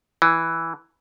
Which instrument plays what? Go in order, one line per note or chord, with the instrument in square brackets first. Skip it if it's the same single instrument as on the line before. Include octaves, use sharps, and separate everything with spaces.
[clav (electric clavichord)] E3